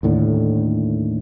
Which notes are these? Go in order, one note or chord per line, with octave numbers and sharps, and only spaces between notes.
D#2 A2 D3